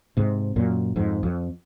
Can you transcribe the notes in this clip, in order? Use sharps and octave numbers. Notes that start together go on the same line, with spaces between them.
G#2 C3
F#2 A#2
F2 G#2
F2